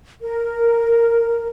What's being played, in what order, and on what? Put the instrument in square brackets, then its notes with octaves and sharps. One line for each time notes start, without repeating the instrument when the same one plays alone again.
[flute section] A#4